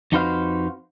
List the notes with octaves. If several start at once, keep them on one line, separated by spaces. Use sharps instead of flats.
F2 D#4 F#4 B4 C5 F5